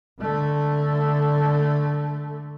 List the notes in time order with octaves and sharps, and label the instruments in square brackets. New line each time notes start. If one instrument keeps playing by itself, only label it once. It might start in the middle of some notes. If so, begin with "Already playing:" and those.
[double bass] D3 A3